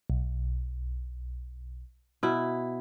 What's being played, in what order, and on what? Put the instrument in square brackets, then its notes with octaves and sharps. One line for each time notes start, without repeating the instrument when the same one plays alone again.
[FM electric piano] B1
[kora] B2 E4